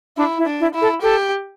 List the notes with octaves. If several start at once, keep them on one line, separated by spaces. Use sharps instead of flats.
D4 E4
E4
D4
E4
E4
A4
G4 A4